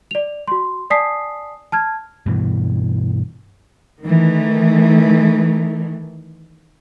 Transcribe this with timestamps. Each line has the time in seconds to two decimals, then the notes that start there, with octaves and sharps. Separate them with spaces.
0.11 D5 F7
0.48 F#4 C6
0.90 D5 G#5 A5 D#6 B6 C7
1.72 A5 F6 G#6
2.26 G2 B2 E3
4.04 D#3 E3 A3